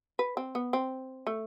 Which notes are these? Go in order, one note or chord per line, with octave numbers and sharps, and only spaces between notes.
B4
C4
B3
C4
A3